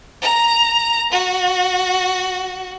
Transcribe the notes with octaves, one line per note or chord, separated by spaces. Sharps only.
A#5
F#4